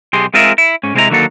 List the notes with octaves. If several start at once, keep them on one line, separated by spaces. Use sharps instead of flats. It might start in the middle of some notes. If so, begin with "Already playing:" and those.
B1 G4 G#4 C6
G#3 C4 F4 G#4 A#4 E5
E4
G#2 C#4
C3 G#3 C4 E4 D#5 A#5
D3 D#3 F#3 A#3 F#4 A4